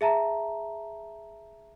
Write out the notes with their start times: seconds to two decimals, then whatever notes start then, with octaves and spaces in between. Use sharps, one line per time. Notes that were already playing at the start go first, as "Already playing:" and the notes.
0.01 G#4 E5 A5 A#5